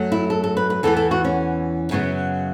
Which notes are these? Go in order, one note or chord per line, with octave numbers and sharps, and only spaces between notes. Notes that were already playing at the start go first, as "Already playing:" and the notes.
Already playing: F#2 F#3 A3
E4
A4
A4
B4
B4
E2 E3 B3 A4
A4
F#4
C#4
F#2 C#3 F#3 B3